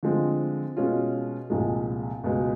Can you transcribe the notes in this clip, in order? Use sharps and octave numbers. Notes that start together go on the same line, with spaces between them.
D3 F3 G#3 C4
B2 G#3 C#4 F4
C2 A#2 F3 G#3
C#2 B2 G#3